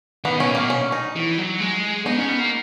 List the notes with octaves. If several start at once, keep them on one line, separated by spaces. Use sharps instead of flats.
D#3 B3
B2 C#4
A#2
B2 A#3
C#4
D#4
E3
F#3
G#3
B3 D#4
C#4
B3
A#3